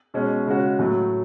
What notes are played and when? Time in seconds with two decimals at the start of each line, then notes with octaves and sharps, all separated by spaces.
0.14 B2 G#3 C#4
0.47 C#3 G#3 C#4 F#4
0.79 A2 F#3 A3